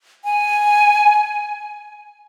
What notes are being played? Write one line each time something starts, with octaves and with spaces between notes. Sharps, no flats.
G#5